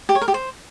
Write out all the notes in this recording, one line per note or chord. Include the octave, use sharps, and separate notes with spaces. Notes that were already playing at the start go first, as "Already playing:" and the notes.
G4
C#5
A#4
G4
C5